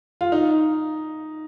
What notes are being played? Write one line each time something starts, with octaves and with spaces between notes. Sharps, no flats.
F4
D#4